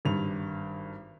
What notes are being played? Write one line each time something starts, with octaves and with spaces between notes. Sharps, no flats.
G#1 G2 F7